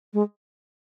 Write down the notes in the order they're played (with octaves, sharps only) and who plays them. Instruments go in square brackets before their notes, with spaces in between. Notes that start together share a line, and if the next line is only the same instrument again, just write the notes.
[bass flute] G#3